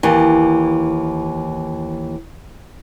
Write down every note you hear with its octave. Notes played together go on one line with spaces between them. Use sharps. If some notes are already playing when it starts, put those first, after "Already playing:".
D#2 E3